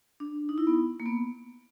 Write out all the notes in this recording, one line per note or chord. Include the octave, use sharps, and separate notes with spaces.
D4
D#4
E4
B3
A#3
B3